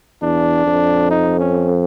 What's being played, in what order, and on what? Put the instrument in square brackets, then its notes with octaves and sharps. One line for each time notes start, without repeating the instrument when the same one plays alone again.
[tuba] E2 [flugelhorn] D4
[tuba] F2
[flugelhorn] D#4
C#4